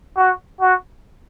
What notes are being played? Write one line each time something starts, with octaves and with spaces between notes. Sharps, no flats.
F#4
F#4